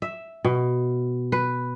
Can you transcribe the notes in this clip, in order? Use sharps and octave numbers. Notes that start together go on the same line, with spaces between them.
E5
B2
B4